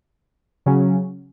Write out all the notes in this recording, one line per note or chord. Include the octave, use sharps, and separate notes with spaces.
C#3 F#3 C#4